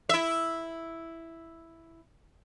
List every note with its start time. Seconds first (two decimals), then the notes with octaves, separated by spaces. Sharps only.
0.09 E4 E5